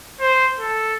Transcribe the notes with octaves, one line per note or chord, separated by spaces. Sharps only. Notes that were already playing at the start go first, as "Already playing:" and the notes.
C5
A4